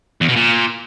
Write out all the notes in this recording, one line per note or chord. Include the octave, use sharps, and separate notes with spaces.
E2
B2
A#2